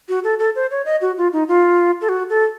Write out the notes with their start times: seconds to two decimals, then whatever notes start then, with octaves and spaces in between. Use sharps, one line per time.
0.09 F#4
0.24 A4
0.39 A4
0.56 C5
0.71 C#5
0.85 D#5
1.01 F#4
1.17 F4
1.33 D#4
1.48 F4
2.01 A4
2.09 F#4
2.30 A4